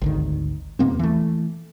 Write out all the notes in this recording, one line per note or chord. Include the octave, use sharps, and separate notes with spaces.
G#1 D2 D#3
E2 B2 A#3 C4
E3 A3